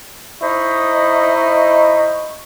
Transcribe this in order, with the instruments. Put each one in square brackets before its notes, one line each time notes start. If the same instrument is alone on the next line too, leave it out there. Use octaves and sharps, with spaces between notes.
[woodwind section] D#4 E4 C5 D#5 B5 C#6